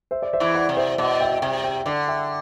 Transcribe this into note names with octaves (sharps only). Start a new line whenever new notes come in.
C5 E5
D5
C5 E5
E2 E3
D5 F#5
C3
C5 E5
B2 D5 F#5
E5 G5
C3 E5 G5
E5 G5
D3 D5 F#5
E5 G5